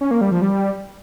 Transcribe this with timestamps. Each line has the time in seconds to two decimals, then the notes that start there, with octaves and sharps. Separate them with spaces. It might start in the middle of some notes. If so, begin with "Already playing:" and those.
0.01 C#4
0.11 A#3
0.21 G3
0.31 F3
0.42 G3